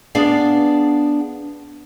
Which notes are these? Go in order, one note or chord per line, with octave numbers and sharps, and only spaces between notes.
B3 D4 G#4 D5 F5